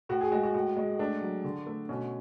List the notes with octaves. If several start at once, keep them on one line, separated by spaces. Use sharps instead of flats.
A2 F#4
G#4
G#3 F#4
F#4
A2 F#4
G#3
A3 D4
F#3
D3
A3
B2 C#4